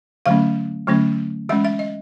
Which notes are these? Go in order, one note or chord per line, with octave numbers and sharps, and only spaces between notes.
D3 F#3 A3 C#4 F5
D3 F#3 A3 C#4
E3 G#3 C#4 E5
E5
D#5